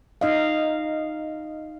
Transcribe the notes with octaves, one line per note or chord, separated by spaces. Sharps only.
D#4 D#5 F5